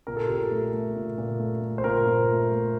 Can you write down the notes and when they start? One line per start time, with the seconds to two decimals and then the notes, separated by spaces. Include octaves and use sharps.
0.07 A#2 A#4
0.17 A4
0.27 A#2 G4
0.38 A4
0.51 A3
0.73 A3
0.96 A#2
1.18 A#2
1.40 A3
1.62 A3
1.78 C5
1.84 A#2 A#4
2.07 A#2
2.29 A3
2.51 A3